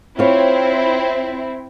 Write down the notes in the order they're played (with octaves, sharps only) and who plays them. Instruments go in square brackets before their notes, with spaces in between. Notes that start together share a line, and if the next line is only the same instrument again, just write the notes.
[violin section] C4 E4 [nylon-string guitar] F4 C#5